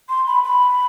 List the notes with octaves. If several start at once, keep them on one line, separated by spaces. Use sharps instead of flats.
C6
B5
B5